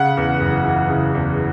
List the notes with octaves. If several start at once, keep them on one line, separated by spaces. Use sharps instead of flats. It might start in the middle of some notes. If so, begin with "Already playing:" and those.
Already playing: C#3 F#5
E2
F#1
E3
C#3
E2